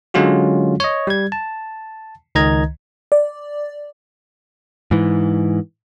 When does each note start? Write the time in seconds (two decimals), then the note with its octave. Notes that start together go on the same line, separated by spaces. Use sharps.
0.14 D3 F#3 G#3 C#4 F4 F#4
0.80 C#5 D#5
1.07 G3 G#6
1.32 A5
2.35 C#2 D#3 D#5 A#5 G#6
3.12 D5
4.91 G#2 E3